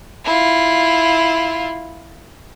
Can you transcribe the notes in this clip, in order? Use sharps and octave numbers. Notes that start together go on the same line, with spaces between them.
E4 F4